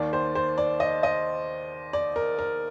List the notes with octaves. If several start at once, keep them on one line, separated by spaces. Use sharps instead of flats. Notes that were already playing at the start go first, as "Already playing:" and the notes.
Already playing: D#2 D#3 D5
C5
C5
D5
D#5
D#5
D5
A#4
A#4